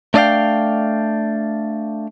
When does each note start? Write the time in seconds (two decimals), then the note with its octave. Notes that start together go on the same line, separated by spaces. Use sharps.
0.14 A3 D4 D5 D#5 F5 G5